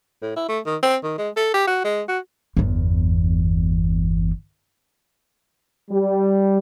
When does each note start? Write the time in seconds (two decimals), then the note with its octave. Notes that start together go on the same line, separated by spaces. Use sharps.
0.22 A2
0.36 E4
0.49 A3
0.66 D#3
0.83 C4
1.03 D#3
1.18 G#3
1.36 A4
1.54 G4
1.67 F#4
1.84 G#3
2.08 F#4
2.57 G1 E2
5.91 G3